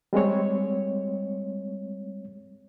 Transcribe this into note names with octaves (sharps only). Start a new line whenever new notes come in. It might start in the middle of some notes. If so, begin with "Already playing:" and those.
G3 G#3 C4 C#5